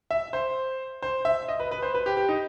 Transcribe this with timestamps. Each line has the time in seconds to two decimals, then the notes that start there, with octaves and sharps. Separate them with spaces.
0.11 E5
0.33 C5
1.02 C5
1.25 E5
1.49 D#5
1.60 B4
1.71 B4
1.82 C5
1.94 B4
2.06 G4
2.17 G4
2.29 D#4